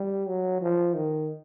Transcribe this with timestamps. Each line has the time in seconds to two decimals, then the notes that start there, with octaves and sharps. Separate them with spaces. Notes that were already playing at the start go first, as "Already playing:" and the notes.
Already playing: G3
0.28 F#3
0.61 F3
0.94 D#3